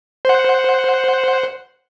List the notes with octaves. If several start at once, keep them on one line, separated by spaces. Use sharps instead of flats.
C5 F#5